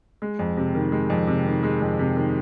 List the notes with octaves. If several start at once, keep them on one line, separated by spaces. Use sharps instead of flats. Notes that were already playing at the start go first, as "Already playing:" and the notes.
G#3
F2
C3
D#3
G#3
F2
C3
D#3
G#3
F2
C3
D#3